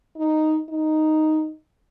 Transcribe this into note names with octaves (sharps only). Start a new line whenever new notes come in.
D#4
D#4